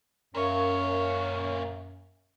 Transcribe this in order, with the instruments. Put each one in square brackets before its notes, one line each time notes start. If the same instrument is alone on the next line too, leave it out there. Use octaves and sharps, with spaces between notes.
[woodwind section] F#2 [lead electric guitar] A#2 C#5 [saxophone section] C#4 [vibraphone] A#4 E5 F5